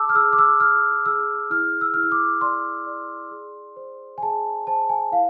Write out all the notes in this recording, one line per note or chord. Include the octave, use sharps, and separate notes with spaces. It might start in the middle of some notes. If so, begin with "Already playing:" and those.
Already playing: G#4 A5 D6 E6
F6
G#4 E6
D6
E6
G#4 F6
G#4 E6
E4 F6
E6
E4 F6
E6
D6
D5 C6
D5
G#4
C5
G#5
G#4 A5
C5 A5
G#5
E4 F5